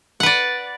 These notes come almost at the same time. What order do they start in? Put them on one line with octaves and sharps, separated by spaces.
F#5 B4 D5